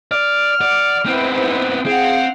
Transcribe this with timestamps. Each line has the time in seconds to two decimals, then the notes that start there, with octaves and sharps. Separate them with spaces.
0.11 D5 F6
0.61 D5 F#5 D6
1.06 G#2 B3 C4 E4 B4
1.86 C4 G#4 F5 F#5